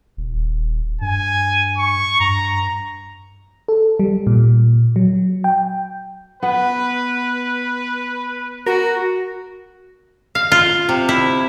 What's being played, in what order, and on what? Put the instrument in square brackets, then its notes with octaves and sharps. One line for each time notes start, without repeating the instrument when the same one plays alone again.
[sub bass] D#1
[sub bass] G2 [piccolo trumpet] G#5
[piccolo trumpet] C#6
[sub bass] G2 [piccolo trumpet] A#5
[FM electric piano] A4
G3
A#2
F#3
G5
[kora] B3 F#5 [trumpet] B4
[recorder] F#4 [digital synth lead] A#4
[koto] F5
F4
C3
E4